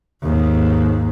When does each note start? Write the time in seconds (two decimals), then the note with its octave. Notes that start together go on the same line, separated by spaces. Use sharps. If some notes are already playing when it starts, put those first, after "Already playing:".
0.23 D#2 G#2